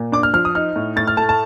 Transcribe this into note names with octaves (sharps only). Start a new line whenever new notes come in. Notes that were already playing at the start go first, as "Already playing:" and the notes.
Already playing: A#2
D4 D6
F6
F3 F6
D#6
D#4 F6
A2
A2 A6
F6
A3 A5
A5